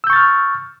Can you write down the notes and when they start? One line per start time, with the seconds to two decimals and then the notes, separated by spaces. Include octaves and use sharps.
0.04 E6
0.07 G6
0.10 C#6
0.13 A6
0.16 F6